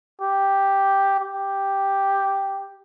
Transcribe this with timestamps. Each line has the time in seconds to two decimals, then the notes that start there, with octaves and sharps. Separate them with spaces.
0.21 G4
1.20 G4